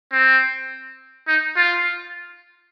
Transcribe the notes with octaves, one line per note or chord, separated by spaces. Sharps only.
C4
D#4
F4